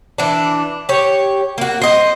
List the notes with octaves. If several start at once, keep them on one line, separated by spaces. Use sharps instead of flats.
E3 D4
G4 C#5
A#3 F#4
C5 D#5